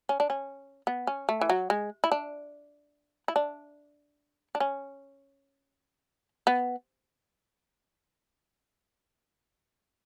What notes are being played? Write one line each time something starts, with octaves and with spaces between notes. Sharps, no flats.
C#4
D4
C#4
B3
C#4
A3
E3
F#3
G#3
E4
D4
E4
D4
D4
C#4
B3